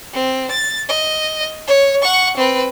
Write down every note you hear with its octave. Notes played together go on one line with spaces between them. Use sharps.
C4
A6
D#5
C#5
F#5 C#6
C4 B4